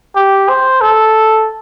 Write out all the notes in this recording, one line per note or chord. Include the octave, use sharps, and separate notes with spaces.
G4
C5
A4